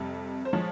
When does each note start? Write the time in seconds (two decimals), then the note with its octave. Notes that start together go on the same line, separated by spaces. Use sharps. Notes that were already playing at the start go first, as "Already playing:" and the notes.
Already playing: F2 C3 G3 E5
0.45 C5
0.53 F3 G#3 C#5